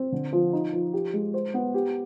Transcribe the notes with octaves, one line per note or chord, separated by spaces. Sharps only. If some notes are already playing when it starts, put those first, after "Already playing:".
Already playing: C4
D3
F3
D#4
F3
G4
G#3
C5
B3
G4